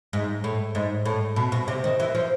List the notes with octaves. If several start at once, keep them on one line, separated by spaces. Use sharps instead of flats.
G#2
A2
G#2
A2
B2
B2
C3
D#3
E3
F3